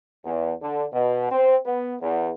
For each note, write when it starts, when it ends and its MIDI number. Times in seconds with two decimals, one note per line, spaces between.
0.25 0.53 40
0.61 0.85 50
0.92 1.27 47
1.32 1.56 60
1.65 1.95 59
2.01 2.30 40